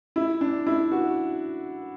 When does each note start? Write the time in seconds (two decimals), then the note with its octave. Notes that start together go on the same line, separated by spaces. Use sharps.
0.16 E4
0.41 D4
0.67 E4
0.92 F#4